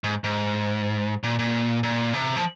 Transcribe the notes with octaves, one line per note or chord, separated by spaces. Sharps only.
G#2
G#2
A#2
A#2
A#2
C3
F3